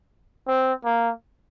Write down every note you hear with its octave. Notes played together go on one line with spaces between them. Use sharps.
C4
A#3